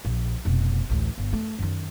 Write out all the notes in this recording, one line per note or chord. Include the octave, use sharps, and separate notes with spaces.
A#1
F1 B2
A1 D2
G1
A3
F#2 D#3